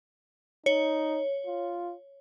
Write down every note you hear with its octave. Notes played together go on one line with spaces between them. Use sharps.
D#4 C#5
F4